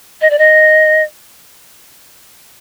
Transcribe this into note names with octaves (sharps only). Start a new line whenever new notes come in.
D#5
D5
D#5